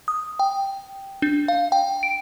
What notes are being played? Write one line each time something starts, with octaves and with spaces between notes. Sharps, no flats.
D#6
G5
D4
F5
G5
D7